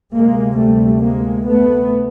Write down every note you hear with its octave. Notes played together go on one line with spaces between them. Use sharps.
D2 C3 G#3 A#3
G3 A3
G#3 A#3
A3 B3